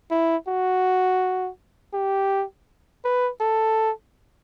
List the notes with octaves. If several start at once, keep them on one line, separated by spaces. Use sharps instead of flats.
E4
F#4
G4
B4
A4